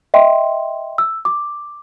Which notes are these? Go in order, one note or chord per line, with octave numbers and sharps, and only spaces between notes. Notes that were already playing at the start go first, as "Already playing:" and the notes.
D#5 E5 G5 C6
E6
D6